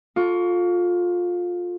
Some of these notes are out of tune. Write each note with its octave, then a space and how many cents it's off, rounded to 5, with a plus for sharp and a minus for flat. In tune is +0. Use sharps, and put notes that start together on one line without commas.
F4 +20 A4 +5 C#6 +35